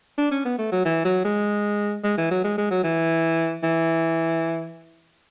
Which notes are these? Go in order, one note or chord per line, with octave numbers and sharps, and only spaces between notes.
D4
C#4
B3
A3
F#3
E3
F#3
G#3
G#3
E3
F#3
G#3
G#3
F#3
E3
E3